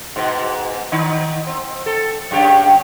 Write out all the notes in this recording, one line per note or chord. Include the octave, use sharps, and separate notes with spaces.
G#2 B2
D#3 D#4
C4
A4
F#2 C#3 G4